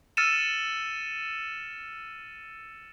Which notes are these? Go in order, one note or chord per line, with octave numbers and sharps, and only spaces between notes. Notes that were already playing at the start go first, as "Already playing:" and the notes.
E6 F6 A6 C#7 D#7 E7